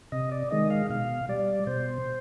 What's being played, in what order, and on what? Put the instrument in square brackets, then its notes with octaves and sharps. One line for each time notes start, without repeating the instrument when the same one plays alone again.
[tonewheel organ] C3 D#5
D5
D#3 G#3 D#5
F5
B2 F5
G3 D5
B2 C5